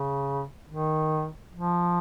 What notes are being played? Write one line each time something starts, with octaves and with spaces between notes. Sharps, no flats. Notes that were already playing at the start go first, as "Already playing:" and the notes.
Already playing: C#3
D#3
F3